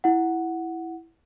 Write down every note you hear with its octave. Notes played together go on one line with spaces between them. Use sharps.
E4 F#5